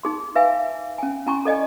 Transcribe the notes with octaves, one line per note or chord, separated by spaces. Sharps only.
D#4 G#4 C6
B4 E5 F5 G#5
C#4 G5 G#5
C#4 E4 G#5 A#5 C6 C#6
A4 D5 D#5 G5 G#5